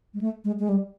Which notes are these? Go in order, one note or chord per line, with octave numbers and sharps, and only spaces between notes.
G#3
A3
G#3
G#3
G3